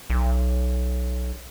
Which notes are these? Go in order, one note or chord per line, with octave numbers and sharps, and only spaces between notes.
B1